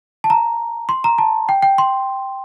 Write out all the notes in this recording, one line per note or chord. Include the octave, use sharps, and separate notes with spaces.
A5
A#5
C6
A#5
A5
G5
G5
C6